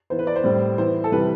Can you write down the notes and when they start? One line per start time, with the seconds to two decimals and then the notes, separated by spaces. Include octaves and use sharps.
0.10 E3 B3 C5
0.19 B4
0.27 D5
0.36 C5
0.44 A2 G3 C4
0.78 E3 B3 C5
1.04 A4
1.12 C3 E3 G3 B4